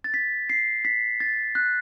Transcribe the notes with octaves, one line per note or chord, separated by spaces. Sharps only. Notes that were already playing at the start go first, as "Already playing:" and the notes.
A6
B6
C7
B6
A6
F#6